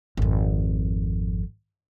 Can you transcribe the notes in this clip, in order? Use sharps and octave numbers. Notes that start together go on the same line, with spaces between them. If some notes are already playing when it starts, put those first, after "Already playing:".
G#1 F2